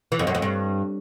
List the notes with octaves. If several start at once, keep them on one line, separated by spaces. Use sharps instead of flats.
E3
F2
F#2
F2
G2